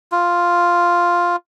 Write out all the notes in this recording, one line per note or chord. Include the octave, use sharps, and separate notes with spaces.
F4